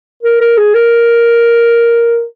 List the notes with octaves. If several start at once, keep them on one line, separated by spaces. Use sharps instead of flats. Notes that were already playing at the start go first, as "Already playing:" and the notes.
A#4
A#4
G#4
A#4